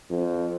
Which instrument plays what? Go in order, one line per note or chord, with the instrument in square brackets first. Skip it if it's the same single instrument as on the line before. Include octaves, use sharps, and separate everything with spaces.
[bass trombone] F2